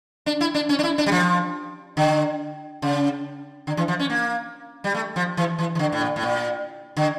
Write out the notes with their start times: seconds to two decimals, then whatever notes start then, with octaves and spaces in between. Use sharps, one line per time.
0.26 D4
0.41 E4
0.54 D4
0.69 C#4
0.79 D4
0.83 E4
0.98 D4
1.06 G3
1.12 F3
1.97 D3
2.82 C#3
3.67 D3
3.77 E3
3.88 F3
3.99 C#4
4.10 A#3
4.84 G3
4.94 A3
5.16 F3
5.37 E3
5.59 E3
5.75 E3
5.79 D3
5.92 A2
6.01 A#2
6.16 A2
6.23 A#2
6.97 D3